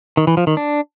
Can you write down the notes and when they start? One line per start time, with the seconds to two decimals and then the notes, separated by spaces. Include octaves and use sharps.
0.17 D#3
0.27 E3
0.37 F3
0.47 D#3
0.57 D4